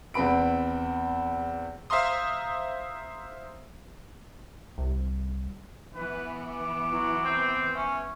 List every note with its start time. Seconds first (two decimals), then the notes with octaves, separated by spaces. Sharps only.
0.14 E2 C4 B4 B5 D7
1.90 C5 E5 F5 A#5 C6 D#6
4.78 C2
5.95 E3 B3 B4
6.41 B5 D6
6.92 F#3 E4
7.25 C4 G6
7.75 C#4 E5